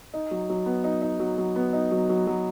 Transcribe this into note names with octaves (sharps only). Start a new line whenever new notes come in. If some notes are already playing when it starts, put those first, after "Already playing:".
D#4
F#3
F#3
B3
D#4
D#4
F#3
F#3
B3
D#4
F#3
F#3
F#3